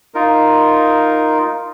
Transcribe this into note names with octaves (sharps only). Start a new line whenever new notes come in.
D#4 F4 A#4